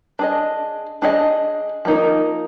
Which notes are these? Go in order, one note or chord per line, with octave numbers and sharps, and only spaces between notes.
D4 G#4 D#5
D4 G#4 D#5
F3 A#3 D#4 A#4